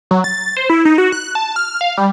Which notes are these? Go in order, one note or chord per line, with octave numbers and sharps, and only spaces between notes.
F#3
A6
C5
E4
D#4
F#4
F#6
A5
F6
F5
G3